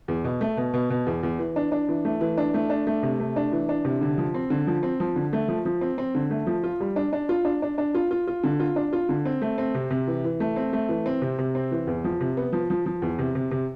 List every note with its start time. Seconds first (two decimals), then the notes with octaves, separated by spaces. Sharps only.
0.08 E2
0.24 B2
0.41 A3
0.57 B2
0.74 B2
0.90 B2
1.07 E2
1.23 E2
1.39 E3
1.56 D4
1.72 D4
1.89 E3
2.05 A3
2.21 E3
2.38 D4
2.54 A3
2.70 D4
2.87 A3
3.03 C3
3.20 A3
3.36 D4
3.52 E3
3.69 D4
3.85 C3
4.01 D3
4.18 F3
4.34 C4
4.50 D3
4.67 F3
4.83 C4
5.00 F3
5.16 D3
5.33 A3
5.48 F3
5.65 F3
5.81 C4
5.98 C4
6.15 D3
6.31 A3
6.47 F3
6.64 F4
6.80 G3
6.96 D4
7.13 D4
7.29 F4
7.45 D4
7.62 D4
7.78 D4
7.95 F4
8.11 F4
8.27 F4
8.44 D3
8.60 F4
8.76 D4
8.93 F4
9.09 D3
9.25 C4
9.42 A3
9.58 C4
9.75 C3
9.91 C3
10.07 E3
10.24 E3
10.40 A3
10.56 C4
10.73 A3
10.89 E3
11.06 C4
11.22 C3
11.38 C3
11.55 C4
11.72 E3
11.87 E2
12.04 F3
12.21 C3
12.37 B3
12.53 F3
12.70 F3
12.86 F3
13.02 E2
13.19 C3
13.35 C3
13.51 C3